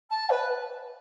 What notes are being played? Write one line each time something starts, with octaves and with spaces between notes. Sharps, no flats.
A5
B4